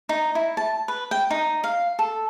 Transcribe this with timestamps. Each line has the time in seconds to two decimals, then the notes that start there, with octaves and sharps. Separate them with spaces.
0.09 D#4
0.35 E4
0.57 A5
0.88 B4
1.11 G5
1.31 D#4
1.64 F5
1.99 A4